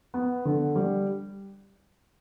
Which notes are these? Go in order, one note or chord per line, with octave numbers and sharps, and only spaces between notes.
B3
D3
G3